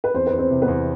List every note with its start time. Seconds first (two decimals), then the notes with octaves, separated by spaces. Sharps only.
0.04 B4
0.14 E2 C4 C5
0.27 B4
0.32 E2
0.38 C4 C5
0.50 C3
0.62 B3 B4
0.68 E2